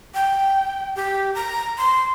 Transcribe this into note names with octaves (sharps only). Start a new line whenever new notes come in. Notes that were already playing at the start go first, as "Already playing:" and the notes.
G5
G4
A#5
C6